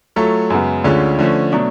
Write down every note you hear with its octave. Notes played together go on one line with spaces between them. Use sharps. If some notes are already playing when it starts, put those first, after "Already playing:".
F#3 A3 F4 A4 C#5
F#2 C#3 G#3 B3
D2 D3 G#3 C#4 F4
D3 F3 A3 C#4
B2 F#3 A3 D4